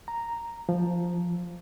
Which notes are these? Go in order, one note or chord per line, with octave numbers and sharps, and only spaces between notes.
A#5
F3